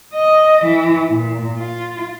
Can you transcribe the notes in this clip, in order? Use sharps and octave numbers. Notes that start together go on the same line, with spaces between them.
D#5
E3
A#2
F4